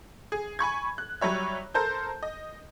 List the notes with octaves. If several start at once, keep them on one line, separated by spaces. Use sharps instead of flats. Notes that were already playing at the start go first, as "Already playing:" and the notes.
G#4
G#5 B5 C#6 G#6
F#6
F#3 G3 C#5 E5
A4 A#4 C5 A5 G6
D#5